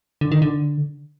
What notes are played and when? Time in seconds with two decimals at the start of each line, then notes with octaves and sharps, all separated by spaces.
0.21 D3
0.32 D#3
0.42 D3